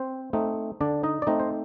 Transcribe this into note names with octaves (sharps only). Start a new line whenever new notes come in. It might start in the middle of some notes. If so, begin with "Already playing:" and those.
Already playing: C4 C5
A3 C4 D#4
D3 D4 D5
D#4 D#5
D5
A3 C4 D#4 D#5
C5